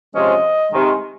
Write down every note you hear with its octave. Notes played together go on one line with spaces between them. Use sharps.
C3 F3 G#3 C#4 F4 D#5
C3 D#3 G#3